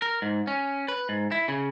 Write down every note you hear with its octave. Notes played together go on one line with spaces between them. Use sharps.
A#4
G#2
C#4
B4
G#2
E4
C#3